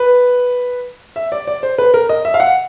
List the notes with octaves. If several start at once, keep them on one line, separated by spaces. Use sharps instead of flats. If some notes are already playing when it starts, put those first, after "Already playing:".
Already playing: B4
E5
D5
D5
C5
B4
A#4
D#5
E5
F5
F#5